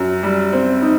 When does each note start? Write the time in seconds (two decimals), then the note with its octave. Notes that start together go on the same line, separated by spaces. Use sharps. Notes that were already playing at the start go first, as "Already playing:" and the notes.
Already playing: F#2
0.23 G3
0.53 C4
0.82 D#4